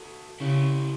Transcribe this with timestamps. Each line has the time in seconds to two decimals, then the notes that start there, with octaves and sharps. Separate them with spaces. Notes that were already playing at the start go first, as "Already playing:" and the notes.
Already playing: F#4 A4
0.40 C#3 E4 G4